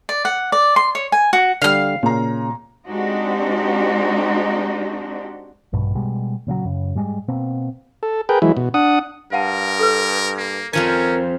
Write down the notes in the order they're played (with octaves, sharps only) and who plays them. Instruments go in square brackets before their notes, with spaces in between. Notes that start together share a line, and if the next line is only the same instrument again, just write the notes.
[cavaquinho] D5
F#5
D5
C6
C#5
G#5
F#4
[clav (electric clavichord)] D3 G3 [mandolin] F5 F6
[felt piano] A#2 A#5 [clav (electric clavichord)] C#3
[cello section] G#3 C4 D4 D#4 F#4 G4
[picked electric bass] A#1 G2 B2
B2 G3 G#3
A#2 C#3 F3 F#3
F#2 C#3
G#2 G3 G#3
B2 A#3 C4
[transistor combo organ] A4
G#4 A#4 B4 G5
E3 F#3 G#3 E4
B2
D4 F#5 D#6
[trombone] G2 [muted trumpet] A#4 [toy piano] F5 F#5 A5
[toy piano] A4 B4
[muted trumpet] A#3
[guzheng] F2 F3 G#5 [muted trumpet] C#4 [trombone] A#4